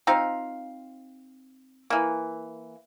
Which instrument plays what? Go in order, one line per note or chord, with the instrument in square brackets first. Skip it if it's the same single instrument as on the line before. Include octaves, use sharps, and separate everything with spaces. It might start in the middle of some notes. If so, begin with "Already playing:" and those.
[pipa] C4 D#4 F4 F5
E3 A#3